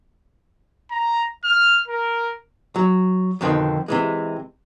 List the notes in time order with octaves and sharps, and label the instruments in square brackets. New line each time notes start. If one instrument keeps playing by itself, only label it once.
[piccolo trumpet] A#5
F6
A#4
[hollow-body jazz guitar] F#3
F2 B2 D3 D#3 C4
C3 E3 G#3